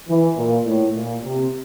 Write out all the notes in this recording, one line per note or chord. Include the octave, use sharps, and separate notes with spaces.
E3
A#2
A2
A#2
C3